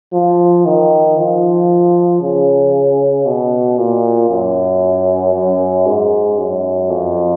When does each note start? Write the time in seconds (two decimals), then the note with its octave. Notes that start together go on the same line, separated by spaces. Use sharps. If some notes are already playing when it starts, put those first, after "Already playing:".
0.13 F3
0.65 D#3
1.18 F3
2.21 C#3
3.26 B2
3.78 A#2
4.30 F#2
5.34 F#2
5.86 G#2
6.38 F#2
6.90 F2